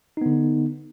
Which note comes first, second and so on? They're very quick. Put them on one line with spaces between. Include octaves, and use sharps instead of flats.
D#4 B3 D3